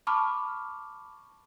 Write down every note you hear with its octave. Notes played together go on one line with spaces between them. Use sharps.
A5 B5 C#6 D6 F6